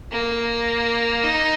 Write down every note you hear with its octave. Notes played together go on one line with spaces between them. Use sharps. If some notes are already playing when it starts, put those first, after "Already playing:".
A#3
D#4